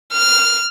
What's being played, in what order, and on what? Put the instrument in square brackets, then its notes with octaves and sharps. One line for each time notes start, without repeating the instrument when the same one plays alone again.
[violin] F6